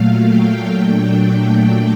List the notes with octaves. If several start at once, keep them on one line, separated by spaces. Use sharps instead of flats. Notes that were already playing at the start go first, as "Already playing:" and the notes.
Already playing: A#2 F#3 A3 F5
G5
A#2 F#3 A3 D4